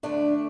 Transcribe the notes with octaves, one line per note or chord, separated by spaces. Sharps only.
D2 D3 A3 D4